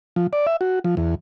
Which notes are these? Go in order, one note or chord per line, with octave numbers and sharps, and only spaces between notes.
F3
D5
E5
F#4
F3
E2